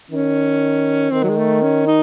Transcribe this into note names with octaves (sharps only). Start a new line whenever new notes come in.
D#3 C#4
D#3 C4
F#3
G#3
A3
C#4
D#4